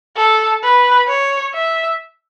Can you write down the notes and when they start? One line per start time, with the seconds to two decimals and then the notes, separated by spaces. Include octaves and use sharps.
0.17 A4
0.63 B4
1.08 C#5
1.54 E5